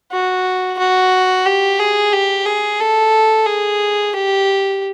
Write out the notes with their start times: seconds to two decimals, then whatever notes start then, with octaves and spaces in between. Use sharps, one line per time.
0.12 F#4
0.79 F#4
1.46 G4
1.80 G#4
2.13 G4
2.46 G#4
2.80 A4
3.47 G#4
4.13 G4